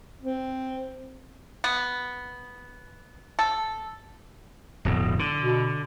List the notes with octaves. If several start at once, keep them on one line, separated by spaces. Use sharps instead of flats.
C4
B3
A4
D1 F2 B2
D3
B2